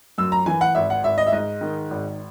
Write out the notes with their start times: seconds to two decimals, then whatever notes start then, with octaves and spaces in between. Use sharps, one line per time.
0.18 F#2 E6
0.32 A#5
0.46 E3 G#5
0.61 F#5
0.75 G#1 E5
0.90 F#5
1.03 G#1 E5
1.18 D#5
1.27 E5
1.32 G#2 D#5
1.61 D#3
1.90 G#1